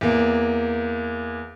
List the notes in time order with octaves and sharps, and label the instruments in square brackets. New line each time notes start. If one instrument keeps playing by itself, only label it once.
[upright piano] E2 A#3